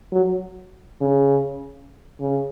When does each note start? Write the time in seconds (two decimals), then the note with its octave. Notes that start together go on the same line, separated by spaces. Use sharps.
0.12 F#3
1.01 C#3
2.20 C#3